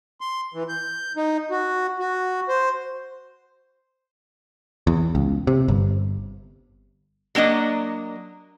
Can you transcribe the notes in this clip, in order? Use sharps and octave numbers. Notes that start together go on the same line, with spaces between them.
C6
E3
G6
D#4
F#4
F#4
C5
E2
C#2
C3
G1
F#3 A#3 D4 D#5